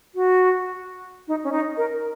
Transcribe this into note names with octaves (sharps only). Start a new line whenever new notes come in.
F#4
D#4
C#4
D#4
A#4